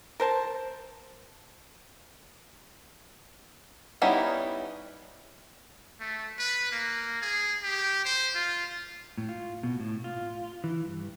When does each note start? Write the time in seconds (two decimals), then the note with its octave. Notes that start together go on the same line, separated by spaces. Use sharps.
0.20 A#4 C5 A5
4.02 G3 B3 C#4 D#4 E4
6.00 A3
6.39 B4
6.72 A#3
7.22 G#4
7.63 G4
8.05 C5
8.35 F4
9.17 A2
9.29 F4
9.63 B2
9.80 A2
10.04 F4
10.64 E3
10.85 G2